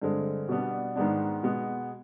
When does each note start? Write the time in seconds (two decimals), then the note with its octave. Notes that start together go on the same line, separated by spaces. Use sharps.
0.02 G2 D3 G#3 C4
0.49 B2 G3 B3 D4
0.96 G#2 D#3 G#3 B3 D4
1.43 B2 G#3 B3